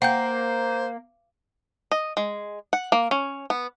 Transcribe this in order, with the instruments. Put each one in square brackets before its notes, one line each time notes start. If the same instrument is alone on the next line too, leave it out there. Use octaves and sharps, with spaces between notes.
[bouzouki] A#3 [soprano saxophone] C5 [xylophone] F#5 G5 G6
[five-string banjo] D#5
G#3
F#5
A#3
C#4
B3